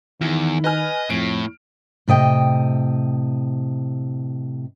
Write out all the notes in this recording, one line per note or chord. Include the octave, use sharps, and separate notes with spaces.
E2 D#3 E4
B4 D#5 G#5 F6
F2 A2 D7
A2 C3 D#5 G5